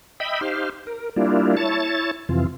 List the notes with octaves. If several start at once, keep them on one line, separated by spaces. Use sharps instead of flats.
D#5 E5 G5 B5
D#4 G4 C5 F5
A#4
G3 A#3 D4 E4 F4
E4 C#5 A5 A6
F2 C3 E3 F4